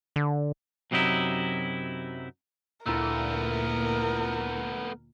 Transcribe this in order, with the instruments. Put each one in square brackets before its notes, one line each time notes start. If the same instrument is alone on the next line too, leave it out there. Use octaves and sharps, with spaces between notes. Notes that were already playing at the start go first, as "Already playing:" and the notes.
[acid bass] D3
[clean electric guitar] F#2 C3 F#3 D#4 E4
[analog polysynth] D2 A#2 [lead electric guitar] A3 B3 [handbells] E4 A#5 E6 [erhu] A#4